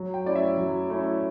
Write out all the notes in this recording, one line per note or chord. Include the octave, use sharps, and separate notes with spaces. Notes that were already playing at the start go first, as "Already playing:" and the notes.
Already playing: F#3
G5
A3 C#4 E4 D5
E5
F#3
A3 C#4 E4